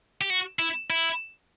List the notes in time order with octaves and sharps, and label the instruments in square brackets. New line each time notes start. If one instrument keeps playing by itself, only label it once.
[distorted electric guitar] G4
F#4
E4
E4